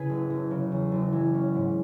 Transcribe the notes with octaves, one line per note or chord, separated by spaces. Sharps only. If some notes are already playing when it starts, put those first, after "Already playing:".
Already playing: C#3 E4 G#4 B4
F#1
F#1
C#3
E2
F#1
E3
C#4
G#2